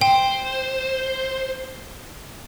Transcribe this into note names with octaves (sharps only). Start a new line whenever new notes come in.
C5 G5